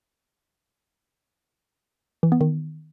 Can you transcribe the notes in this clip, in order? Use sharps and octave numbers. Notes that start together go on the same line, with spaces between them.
E3
B3
D#3